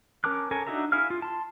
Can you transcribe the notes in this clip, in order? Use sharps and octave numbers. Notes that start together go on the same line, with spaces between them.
C#4 A#4 A5 D6 F#6
A4 A#4 C#5 G#5
D4 D#4 F#4 E5 A#5
E4 G#4 F5 F6
F4
A5 C6